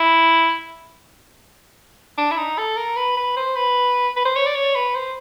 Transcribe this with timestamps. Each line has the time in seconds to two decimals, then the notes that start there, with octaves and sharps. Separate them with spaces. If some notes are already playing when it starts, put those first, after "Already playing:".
Already playing: E4
2.18 D4
2.31 E4
2.37 D#4
2.58 A4
2.77 A#4
2.96 B4
3.17 B4
3.36 C5
3.56 B4
4.16 B4
4.25 C5
4.36 C#5
4.46 D5
4.55 C#5
4.75 B4
4.95 C5